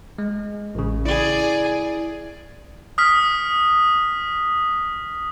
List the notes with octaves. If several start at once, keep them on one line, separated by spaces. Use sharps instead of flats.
G#3
A1 C#3
E4 G#4 D5
D#6 F6 B6